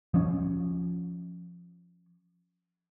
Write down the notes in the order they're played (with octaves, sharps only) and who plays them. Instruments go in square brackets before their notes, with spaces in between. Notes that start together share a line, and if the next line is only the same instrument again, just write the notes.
[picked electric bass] F3 C#4